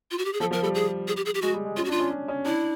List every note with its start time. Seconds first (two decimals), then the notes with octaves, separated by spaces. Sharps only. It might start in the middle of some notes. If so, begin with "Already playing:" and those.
0.11 F4
0.18 F#4
0.25 G4
0.33 G#4
0.40 F3 A4
0.51 F3 A#4
0.62 G3 A4
0.75 G#4
1.08 G#4
1.17 G4
1.26 G#4
1.34 G4
1.42 G#3 F#4
1.53 G3
1.65 G#3
1.76 C#4 F4
1.85 F#4
1.88 D4
1.91 F4
2.00 C#4
2.11 C#4
2.28 C#4
2.45 D4 E4